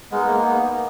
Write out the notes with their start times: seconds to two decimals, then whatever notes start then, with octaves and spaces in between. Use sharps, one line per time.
0.11 G#3 B3 D#4 A#4
0.27 A#3
0.41 B3 D#4